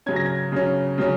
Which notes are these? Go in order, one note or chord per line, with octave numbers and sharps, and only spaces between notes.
C#3 F#3 C#4 G#6
A#6
G#6
C#3 F#3 C#4
C#3 F#3 C#4